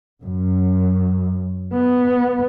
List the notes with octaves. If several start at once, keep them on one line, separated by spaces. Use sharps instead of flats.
F#2
B3